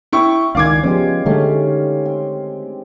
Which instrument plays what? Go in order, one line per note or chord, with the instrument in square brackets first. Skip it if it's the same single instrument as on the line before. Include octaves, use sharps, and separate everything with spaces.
[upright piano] E4 G5 C#6
[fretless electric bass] C#2 D#3 [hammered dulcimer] D5 G#5 C6 [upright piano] F5 D6 G#6
[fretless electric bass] F3 B3 C#4 [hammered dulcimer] G#3 G4
[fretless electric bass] D3 G#3 A3 [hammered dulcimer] D#3 C#4
[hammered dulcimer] C4